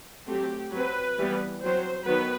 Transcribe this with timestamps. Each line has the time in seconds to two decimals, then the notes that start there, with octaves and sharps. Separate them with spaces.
0.27 F#3 A3 C4 G4
0.72 F#3 C4 B4
1.18 E3 G3 B3
1.62 F#3 C4 C5
2.06 D#3 F#3 B3 B4